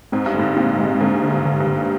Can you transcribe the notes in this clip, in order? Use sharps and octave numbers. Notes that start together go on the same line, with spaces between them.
G#2 C4
G2
G#2 D3
A#2 C4
G#3
G#2 D3
D3
G2
D3
G2
D3